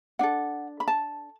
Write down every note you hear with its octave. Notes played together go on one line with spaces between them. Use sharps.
D4 A4 F#5
B5
A5